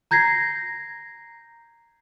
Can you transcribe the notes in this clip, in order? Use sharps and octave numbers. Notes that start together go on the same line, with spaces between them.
A#5 G6 G#6 A#6 C7